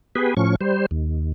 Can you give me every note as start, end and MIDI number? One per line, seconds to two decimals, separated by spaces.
0.15 0.34 59
0.15 0.34 67
0.15 0.34 68
0.15 0.34 71
0.37 0.55 45
0.37 0.55 53
0.37 0.55 61
0.37 0.55 85
0.61 0.86 55
0.61 0.86 72
0.91 1.32 39